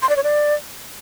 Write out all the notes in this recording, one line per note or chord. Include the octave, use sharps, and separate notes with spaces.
C6
D5
C#5
D5